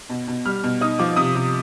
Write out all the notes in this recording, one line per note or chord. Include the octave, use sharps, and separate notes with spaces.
B2
B2
G3 F6
B2
D#4 D#6
F3 D6
C3 D#6
C3